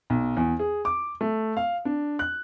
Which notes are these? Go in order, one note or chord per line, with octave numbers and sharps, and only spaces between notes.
B1
E2
G#4
D6
A3
F5
D4
F#6